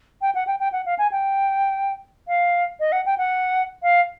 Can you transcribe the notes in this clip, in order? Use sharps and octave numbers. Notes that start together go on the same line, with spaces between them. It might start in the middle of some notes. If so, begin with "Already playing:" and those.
G5
F#5
G5
G5
F#5
F5
G#5
G5
F5
D#5
F#5
G5
F#5
F5